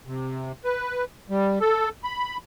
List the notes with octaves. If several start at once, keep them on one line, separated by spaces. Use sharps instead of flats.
C3
B4
G3
A4
B5